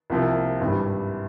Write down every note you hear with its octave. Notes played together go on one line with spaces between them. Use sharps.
C2 C3 F3 A#3
G#1 G2 E3 G3